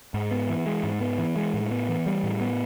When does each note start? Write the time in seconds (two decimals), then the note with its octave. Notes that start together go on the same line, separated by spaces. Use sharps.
0.14 G#2
0.31 B3
0.49 E3
0.66 G#3
0.83 G#2
1.01 B3
1.18 E3
1.36 G#3
1.54 A2
1.71 B3
1.89 E3
2.06 G3
2.23 A2
2.41 B3